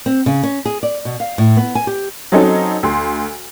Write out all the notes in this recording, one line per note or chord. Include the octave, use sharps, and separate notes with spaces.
C4
C#3
C#4
G#4
D5
B2
F5
A2
B3
G#5
G4
F#3 C4 C#4 D#4 A4 C5
D2 C6